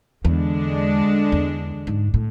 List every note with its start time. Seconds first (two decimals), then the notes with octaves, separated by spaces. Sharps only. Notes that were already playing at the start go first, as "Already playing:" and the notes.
0.24 E2 D3 G#3 D4
1.32 E2
1.87 G#2
2.14 A2